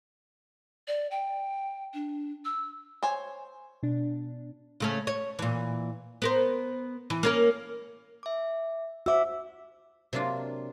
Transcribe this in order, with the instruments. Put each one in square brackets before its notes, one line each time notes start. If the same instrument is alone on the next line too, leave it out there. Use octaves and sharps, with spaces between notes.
[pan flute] D5
G5
D4
E6
[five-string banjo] C5 C#5 G#5
[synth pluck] B2 D4
[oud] C#3 A3 C#4
C#5
A#2 E3
B3 A#4 C5
E3
A#3 C#4 A#4
[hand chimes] E5 D6
[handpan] F#4 E5 [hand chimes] C5 D6 E6
[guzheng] C3 F#3 A#3 D4 F4